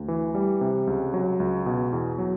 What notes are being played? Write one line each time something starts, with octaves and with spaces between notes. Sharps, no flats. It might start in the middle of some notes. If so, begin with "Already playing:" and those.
Already playing: D2
E3
G3
C3
C#2
F#3
C#2
B2
E2
F#3